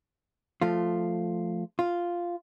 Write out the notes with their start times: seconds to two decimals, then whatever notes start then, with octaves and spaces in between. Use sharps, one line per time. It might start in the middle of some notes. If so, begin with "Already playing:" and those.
0.62 F3 A3 F4
1.79 F4